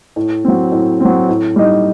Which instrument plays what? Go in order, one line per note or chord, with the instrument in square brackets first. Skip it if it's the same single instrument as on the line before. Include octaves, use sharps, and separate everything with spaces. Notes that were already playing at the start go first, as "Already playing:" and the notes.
[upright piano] A2
F#3 C4
A2
F#3 C4
A2
G3 D#4